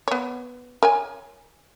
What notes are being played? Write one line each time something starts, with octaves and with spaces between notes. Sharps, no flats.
B3 C#5
A#4 C#5 G#5